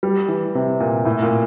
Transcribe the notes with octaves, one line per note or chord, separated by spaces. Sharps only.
G3
E3
C3
A#2
A2
A#2